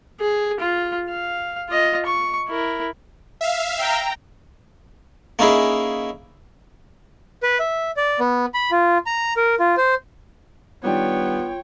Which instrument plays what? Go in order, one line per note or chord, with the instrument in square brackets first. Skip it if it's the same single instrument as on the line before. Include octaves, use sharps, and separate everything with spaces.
[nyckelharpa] G#4
F4
F5
F4 D#5
C#6
E4 A#4
[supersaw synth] E5 F5
[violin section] G5 A#5
[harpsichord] A#3 C#4 D#4 E4 G#4
[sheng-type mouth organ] B4
E5
D5
B3
B5
F4
A#5
A#4
F4
C5
[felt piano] D#3 G3 D4 [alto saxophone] B3 [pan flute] F4 [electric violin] C#5 G5